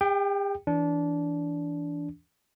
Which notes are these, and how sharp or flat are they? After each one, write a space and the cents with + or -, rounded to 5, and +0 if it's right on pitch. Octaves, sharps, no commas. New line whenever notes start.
G4 +45 G5 +0
E3 +0 D4 -20